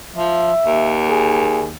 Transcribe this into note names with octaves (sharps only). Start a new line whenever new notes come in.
F3 E5
D#2
G#4